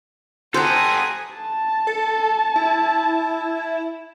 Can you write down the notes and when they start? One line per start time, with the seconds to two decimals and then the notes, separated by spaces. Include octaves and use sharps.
0.54 G4 A4 C5 F#5 G#5 A#5 D#6
1.36 A5
1.87 A4
2.56 E4